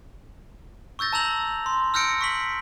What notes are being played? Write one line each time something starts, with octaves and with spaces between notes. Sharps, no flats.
C#6 E6 G6 A6 A#6
A5 A#5 E6 G6 F7 F#7
C6
E6 F6 G6 A#6 C#7 D7
C#6 B6 F#7